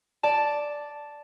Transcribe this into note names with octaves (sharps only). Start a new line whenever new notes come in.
D5 A5